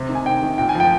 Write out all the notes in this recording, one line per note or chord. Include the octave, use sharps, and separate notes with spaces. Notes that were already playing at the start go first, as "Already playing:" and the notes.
Already playing: C3
D#3
G#5
C3 G5
D#3
A#2 G5
G#5
F3 G5